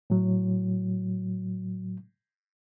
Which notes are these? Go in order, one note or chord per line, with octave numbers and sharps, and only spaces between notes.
A2 F#3